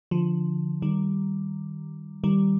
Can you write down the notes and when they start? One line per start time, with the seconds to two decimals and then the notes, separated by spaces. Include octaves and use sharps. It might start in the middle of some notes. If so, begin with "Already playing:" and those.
0.11 D3 F3
0.82 D#3 G3
2.24 D#3 G3